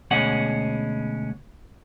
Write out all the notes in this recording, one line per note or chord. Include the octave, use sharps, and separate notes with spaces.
D2 B2 G#3 C#4 F#5